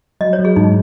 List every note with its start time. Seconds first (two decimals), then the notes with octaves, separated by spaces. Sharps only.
0.21 F#3 D#5
0.33 C#5
0.39 F#3
0.45 G#4
0.56 G#2 D#4